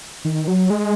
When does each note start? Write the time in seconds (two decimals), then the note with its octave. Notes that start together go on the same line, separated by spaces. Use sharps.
0.25 D#3
0.48 F#3
0.70 G#3